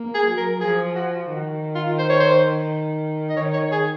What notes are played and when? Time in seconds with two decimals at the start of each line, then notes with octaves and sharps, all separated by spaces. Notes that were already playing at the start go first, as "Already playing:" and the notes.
Already playing: A#3
0.14 G#4
0.26 F#3
0.37 A#4
0.60 F3 G#4
0.95 F#4
1.29 D#3 F#4
1.75 F4
1.98 C5
2.10 C#5
2.20 C5
3.29 D#5
3.37 D#3 C#5
3.53 C#5
3.72 G#4